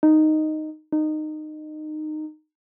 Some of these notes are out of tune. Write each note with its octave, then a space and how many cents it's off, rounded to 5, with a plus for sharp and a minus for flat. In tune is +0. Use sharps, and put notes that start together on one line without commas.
D#4 -5
D#4 -20